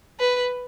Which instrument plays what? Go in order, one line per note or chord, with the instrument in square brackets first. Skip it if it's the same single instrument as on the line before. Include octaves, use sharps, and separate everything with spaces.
[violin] B4